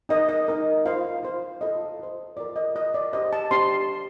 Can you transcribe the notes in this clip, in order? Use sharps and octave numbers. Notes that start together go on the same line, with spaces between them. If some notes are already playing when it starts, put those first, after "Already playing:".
D#4 A#4 D#5
D#5
D#4 A#4
F4 C5 F5
F4 C5
F4 A4 C5 D#5
F4 A4 C5
F4 A#4 D5
D#5
F4 A#4 D#5
D5
D4 G4 C5 D#5
A5
D4 G4 C5 C6